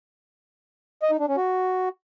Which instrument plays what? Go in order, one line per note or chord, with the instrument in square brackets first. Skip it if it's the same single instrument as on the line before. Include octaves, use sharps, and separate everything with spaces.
[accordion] D#5
D#4
D4
C#4
F#4